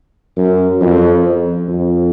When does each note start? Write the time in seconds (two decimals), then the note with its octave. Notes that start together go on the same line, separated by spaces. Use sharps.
0.37 F#2
0.81 F2
1.68 F2